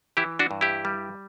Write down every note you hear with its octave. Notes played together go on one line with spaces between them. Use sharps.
E3 E4 G4
D4 F#4
G2
E4 G4
G3